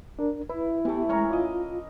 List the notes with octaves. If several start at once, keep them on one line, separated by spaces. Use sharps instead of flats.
D4 A#4
E4 B4
E3 A3 B3 G4
G#3 C#4 A#4 C#5 A#5
F4 D#5 D6